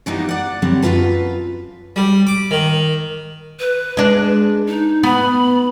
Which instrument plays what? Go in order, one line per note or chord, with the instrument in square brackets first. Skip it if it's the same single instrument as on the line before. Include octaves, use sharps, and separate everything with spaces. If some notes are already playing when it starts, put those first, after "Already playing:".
[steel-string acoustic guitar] E3 F3 G3 A#3 B3 D#4
D5 F#5
D3 F#3 G3 C4
F#2 A#2 F4 B4 A5
[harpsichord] G3
D6
D#3
[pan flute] B4
[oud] G#3 D4
[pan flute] D#4
[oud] B3 [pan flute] B5